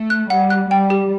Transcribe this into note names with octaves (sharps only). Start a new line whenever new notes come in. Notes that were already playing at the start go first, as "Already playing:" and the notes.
Already playing: A3
F#6
G3 F#5
F#6
G3 G5
G4